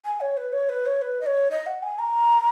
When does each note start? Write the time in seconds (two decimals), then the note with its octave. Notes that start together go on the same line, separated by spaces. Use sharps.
0.05 G#5
0.21 C#5
0.37 B4
0.53 C#5
0.69 B4
0.86 C#5
1.02 B4
1.21 D#5
1.26 C#5
1.51 D#5
1.66 F#5
1.83 G#5
1.99 A#5